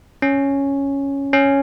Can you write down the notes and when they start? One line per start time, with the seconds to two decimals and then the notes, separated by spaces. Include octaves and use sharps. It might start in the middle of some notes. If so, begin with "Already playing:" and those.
0.22 C#4
1.33 C#4